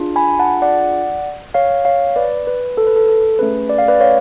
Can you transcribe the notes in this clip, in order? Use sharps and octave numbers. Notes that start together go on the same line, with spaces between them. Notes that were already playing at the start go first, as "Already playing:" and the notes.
Already playing: D4 F4 G#4
G#5 B5
F#5 A5
D5 F#5
C#5 F5
C#5 F5
B4 D5
B4
A4
B4
A4
A4
A3 C#4 G#4 B4
D5
F5
B4 D5
C#5 F5